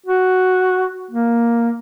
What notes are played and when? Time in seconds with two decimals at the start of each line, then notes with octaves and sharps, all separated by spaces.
0.06 F#4
1.11 A#3